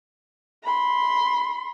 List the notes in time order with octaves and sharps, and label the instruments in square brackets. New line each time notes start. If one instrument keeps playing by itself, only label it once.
[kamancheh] B5 C6